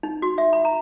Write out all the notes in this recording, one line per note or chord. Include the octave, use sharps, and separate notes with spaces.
D#4
F#4
E5
B5
A#5